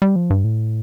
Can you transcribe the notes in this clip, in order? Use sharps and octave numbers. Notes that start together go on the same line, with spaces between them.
G3
F3
G2
A2